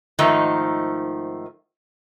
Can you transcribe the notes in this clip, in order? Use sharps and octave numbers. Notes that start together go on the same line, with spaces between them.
G#2 D#3 F3 A3 D#4